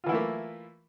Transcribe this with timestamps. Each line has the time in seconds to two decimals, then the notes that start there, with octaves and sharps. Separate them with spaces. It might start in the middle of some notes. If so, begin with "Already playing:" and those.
0.04 F4
0.06 E3
0.09 E4
0.12 A3
0.14 A#3